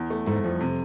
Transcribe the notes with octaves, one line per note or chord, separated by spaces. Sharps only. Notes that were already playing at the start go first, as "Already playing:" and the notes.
Already playing: E2
A3
G#2 A3
F2 F3
C3